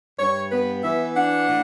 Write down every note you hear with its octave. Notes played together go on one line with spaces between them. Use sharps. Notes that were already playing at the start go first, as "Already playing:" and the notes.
G2 C#5
B3 B4
E3 E5
D4 F#5
A2